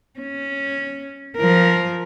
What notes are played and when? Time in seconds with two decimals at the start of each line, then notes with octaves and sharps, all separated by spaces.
0.19 C#4
1.38 F3 A#4